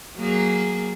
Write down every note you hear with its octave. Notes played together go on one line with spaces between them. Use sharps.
F#3 A#3 G#4